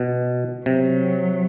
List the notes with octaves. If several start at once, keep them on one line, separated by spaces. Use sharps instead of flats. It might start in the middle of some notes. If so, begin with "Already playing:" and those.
Already playing: B2
C3 F#3